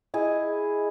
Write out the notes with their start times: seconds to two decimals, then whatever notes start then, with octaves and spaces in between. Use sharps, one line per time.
0.14 E4 G#4 D#5